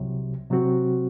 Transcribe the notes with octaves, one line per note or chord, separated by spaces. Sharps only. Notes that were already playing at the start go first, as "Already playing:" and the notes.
Already playing: C2 C3 F#3
C3 F#3 C4 F#4